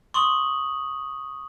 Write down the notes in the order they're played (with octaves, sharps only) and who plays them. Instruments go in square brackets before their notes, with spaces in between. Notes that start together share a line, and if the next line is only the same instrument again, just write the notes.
[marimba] C6 [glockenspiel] C#6 D#6 F#7